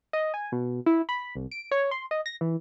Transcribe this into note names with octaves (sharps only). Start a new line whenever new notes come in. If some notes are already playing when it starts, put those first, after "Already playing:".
D#5
G#5
B2
E4
B5
C2
D7
C#5
C6
D#5
A#6
E3